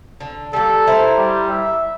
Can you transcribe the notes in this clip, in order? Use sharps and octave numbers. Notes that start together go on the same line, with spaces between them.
D3
G3 A#3 A4
E4 A#4 C5
G3
E5